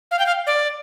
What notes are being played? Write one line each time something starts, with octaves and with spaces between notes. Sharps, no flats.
F5
G5
F5
D5